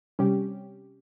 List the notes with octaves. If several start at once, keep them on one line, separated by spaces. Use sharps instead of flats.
C3 G3 C#4 G4